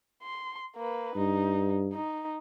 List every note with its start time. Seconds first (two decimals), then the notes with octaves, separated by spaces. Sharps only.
0.22 C6
0.76 A#3 B4
1.16 G2 D#4
1.93 D#4